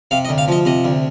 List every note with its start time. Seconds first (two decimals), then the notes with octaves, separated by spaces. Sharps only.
0.11 C3 F5
0.25 D#5
0.29 D2
0.38 F5
0.48 F3 D#5
0.65 C3 D#5
0.84 D2